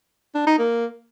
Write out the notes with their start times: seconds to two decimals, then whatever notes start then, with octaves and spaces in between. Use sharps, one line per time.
0.35 D4
0.47 D#4
0.59 A#3